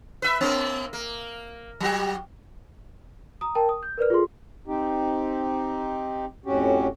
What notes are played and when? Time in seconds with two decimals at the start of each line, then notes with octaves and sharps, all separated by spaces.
0.22 B4 E5
0.41 A#3 B3
0.93 A#3
1.80 F#3 F#4 G4
3.41 A#5 D#6
3.55 A#4 G5 A5
3.69 D#6
3.83 G6
3.98 A#4 B4 D5 F6
4.10 F4 G#4 A4 C6
4.67 C4 D#4 G4
6.46 F2 A2 C#4 F#4 G4